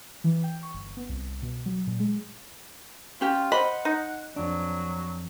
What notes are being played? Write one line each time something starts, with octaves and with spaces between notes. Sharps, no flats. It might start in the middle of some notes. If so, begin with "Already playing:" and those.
E3
G5
C#6
G1
B3
C2
B2
F#3
A#2
G#3
C#4 F4 G4
C5 D#5 F#5 B5
D#4
F2 F#3 D4